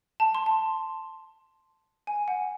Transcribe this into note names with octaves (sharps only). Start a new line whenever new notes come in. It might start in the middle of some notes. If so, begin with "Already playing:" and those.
A5
C6
A5
G#5
F#5